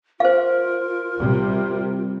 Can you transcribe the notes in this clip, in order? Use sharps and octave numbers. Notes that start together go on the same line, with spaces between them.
F4 A#4 C5 F5
C3 G3